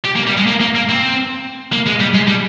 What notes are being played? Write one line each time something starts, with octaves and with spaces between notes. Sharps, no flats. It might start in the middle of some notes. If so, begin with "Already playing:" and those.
G4
A#3
G3
G#3
A#3
A#3
A#3
C4
A#3
G#3
G3
G#3
G3